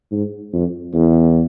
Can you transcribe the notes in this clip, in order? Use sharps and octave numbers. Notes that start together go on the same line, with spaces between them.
G#2
F2
E2